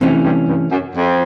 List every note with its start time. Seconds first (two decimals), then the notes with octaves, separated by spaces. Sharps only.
0.01 F2 C3 E3 A3 C#4
0.24 G2
0.48 G2
0.71 F#2
0.95 F2